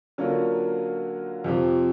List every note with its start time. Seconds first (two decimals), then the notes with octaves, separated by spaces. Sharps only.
0.18 D3 F#3 A#3 C#4 F4
1.44 F2 C3 F3